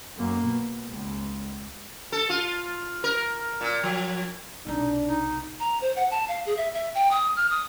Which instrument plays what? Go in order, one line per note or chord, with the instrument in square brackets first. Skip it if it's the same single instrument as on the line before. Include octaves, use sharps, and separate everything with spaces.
[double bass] F#2 A#3
B2
C#2
[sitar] A4
F4
A#4
A#2
F3
[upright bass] B1 C3 [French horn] D4 [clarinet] D#4
[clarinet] D#4
[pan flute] A#5
C5
F#5
A5
F5
G#4
E5
E5
G5
D#6
F6
D#6